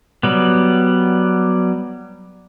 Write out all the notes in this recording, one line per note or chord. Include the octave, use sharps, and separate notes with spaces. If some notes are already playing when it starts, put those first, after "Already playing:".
F#3 G3 B3